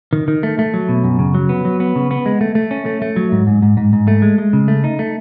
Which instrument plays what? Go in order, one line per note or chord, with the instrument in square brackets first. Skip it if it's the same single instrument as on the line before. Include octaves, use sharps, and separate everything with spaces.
[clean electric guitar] D#3
D#3
A3
A3
F#3
B2
F#2
C#3
F#3
B3
F#3
B3
C#3
B3
G#3
A3
A3
C#4
A3
A3
F#3
G#2
G#2
G#2
G#2
G#2
A3
G#3
G#3
C#3
A3
D#4
A3